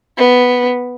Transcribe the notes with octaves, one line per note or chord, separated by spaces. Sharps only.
B3